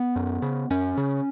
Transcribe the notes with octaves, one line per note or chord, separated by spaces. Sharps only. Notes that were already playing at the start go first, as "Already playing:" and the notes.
Already playing: B3
F#2
C#3
F#2 C#4
C#3